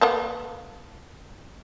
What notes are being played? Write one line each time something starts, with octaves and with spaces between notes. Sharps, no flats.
A#3 B3 A4